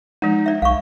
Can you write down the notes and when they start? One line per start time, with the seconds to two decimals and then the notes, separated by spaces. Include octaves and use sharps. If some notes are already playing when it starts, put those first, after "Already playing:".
0.22 F3 G#3 D#4
0.46 D5 E5
0.62 B1 F5 C#6